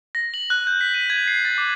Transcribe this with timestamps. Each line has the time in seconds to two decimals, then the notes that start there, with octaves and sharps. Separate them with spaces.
0.15 A#6
0.34 F#7
0.50 F#6
0.67 G6
0.81 B6
0.94 D#7
1.10 G#6
1.28 C7
1.45 A6
1.58 D6